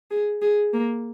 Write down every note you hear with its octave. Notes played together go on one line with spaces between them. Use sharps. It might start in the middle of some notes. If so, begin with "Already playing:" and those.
G#4
G#4
A#3